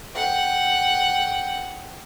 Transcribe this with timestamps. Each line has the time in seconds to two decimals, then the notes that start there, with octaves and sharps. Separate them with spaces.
0.16 F#5 G5